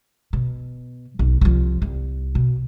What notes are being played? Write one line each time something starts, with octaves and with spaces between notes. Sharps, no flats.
B2
B1
C2 F3
C2
B2